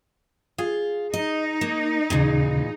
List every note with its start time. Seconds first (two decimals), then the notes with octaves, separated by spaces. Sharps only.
0.58 F4 G#4
1.14 D#4 D#5
1.61 A#3
2.10 D#2 A#2 C#3 E3 G#4